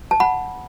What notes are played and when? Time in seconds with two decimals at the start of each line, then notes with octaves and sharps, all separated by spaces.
0.11 A5
0.20 F#5 B5